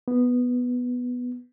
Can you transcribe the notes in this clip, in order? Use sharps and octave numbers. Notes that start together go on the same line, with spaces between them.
B3